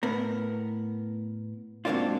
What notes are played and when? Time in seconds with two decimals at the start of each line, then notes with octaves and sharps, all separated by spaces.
0.03 A2 B3 A#4
1.85 G#2 F#3 A#3 C4 D4 F4